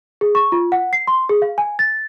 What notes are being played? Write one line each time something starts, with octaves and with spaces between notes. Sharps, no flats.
G#4
C#6
F4
F#5
C7
C6
G#4
F5
G#5
A6